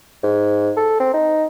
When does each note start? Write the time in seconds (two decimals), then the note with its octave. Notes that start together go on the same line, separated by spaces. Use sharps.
0.24 G#2
0.77 A4
1.00 C4
1.14 D#4